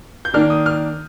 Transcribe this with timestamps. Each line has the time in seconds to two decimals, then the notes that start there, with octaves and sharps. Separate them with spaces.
0.25 G6
0.34 D#3 A#3 D4 F6
0.50 D#6
0.66 F6